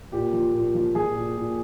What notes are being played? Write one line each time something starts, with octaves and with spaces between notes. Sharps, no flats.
A#2 G4
F3
A#2
F3
F3 G#4
A#2
A#2